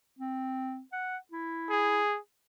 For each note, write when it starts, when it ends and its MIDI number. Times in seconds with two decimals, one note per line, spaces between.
0.19 0.81 60
0.92 1.17 78
1.32 2.01 64
1.70 2.18 68